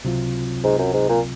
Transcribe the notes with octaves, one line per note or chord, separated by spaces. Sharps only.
C#2 C3 F#3 C4 F4
G#2
F#2
G#2
A#2